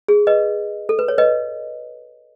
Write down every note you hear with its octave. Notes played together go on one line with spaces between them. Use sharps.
G#4
B4 D#5
A4
B4
C#5
B4 D#5